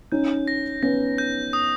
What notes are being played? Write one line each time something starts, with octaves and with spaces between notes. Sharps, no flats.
C#4 D#4 G6
A#6
B3 C#4 A#6
G6
D#6